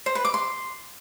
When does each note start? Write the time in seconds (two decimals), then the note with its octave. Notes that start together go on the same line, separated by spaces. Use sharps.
0.06 C5
0.15 B4
0.25 D6
0.34 C6